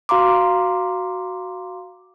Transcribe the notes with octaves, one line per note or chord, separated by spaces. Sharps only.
F#4 F5 A#5 C6 D6